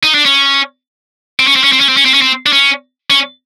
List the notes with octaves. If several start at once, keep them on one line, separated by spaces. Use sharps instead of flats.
D#4
D4
C#4
C4
C#4
C4
C#4
C4
C#4
C4
C#4
C4
C#4
C4
D4
C#4
C#4